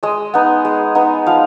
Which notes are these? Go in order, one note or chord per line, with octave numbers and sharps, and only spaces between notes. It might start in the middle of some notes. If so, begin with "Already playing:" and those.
G#3 D#5
B3 D#4
G#3
B3 D#4
F3 F5